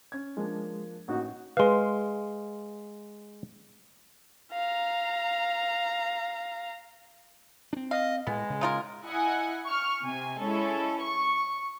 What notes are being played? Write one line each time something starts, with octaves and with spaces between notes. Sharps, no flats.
C#4 G#6
F3 G#3 A#3 D4
A1 A#3 D#4 F#4
G#3 B4 F5 C6
F5 A#5
C4 D4
D#5 F5
A2 G#3 B3
C#3
D#4 F4 A#4
E4 D#5 F#5 G#5
C#6 F6
C3 G#5
G#3 C#4 E4 A4
C#6